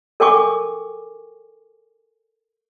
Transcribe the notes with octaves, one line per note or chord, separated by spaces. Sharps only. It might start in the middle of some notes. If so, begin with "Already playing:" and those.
A4 A#4 G5 G#5 C#6 D6